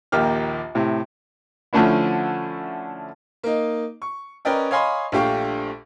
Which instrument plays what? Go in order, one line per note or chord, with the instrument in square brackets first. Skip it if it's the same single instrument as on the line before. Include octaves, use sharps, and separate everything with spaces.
[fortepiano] A#1 D#2 A#3 G4 F6
A2 C3
D3 F3 A3 C#4 D4 E4
[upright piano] A#3 D#4
C#6
C#4 A#4 B4 D5 D#5 G5
C#5 D#5 F5 G#5 B5 C6
A#1 A3 D4 G4 F5 C#6